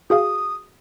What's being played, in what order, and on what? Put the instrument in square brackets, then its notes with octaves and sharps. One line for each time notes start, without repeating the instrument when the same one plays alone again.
[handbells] F#4 G#4 F5 [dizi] D#6